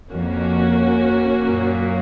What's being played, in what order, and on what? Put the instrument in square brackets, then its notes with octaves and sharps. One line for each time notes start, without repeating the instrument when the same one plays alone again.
[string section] F2 [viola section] A#3 C#4 F#4
[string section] F#2 A#2